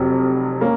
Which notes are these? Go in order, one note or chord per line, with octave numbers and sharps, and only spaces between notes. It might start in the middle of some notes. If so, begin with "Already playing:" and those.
Already playing: F1 F2 C3 F#3
A#3 C#4